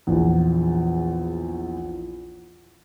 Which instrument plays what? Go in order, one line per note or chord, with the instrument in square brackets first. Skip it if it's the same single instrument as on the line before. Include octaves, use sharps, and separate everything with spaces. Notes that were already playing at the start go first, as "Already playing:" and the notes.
[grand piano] A#1 E2